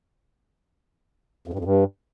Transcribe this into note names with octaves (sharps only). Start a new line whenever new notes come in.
F2
G2
F2
G2